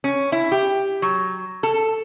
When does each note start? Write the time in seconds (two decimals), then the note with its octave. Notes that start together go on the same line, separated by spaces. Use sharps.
0.04 C#4
0.32 E4
0.52 G4
1.02 F#3
1.63 A4